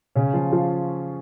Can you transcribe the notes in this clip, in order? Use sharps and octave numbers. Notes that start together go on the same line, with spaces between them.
C#3 C#4
F3 F4
F3 F4